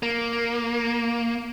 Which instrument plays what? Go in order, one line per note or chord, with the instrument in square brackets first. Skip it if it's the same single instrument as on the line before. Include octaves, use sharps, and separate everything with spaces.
[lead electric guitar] A#3